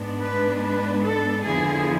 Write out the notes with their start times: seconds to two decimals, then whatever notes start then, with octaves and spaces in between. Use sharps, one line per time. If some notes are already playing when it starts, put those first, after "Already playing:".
Already playing: G#2 G#3 B3 D4
0.21 B4
0.63 B4
1.04 A4
1.44 F2 D3 F3 B3 E4 G#4